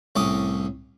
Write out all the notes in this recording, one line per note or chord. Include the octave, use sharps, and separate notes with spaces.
C2 A2 C#4 D6 D#6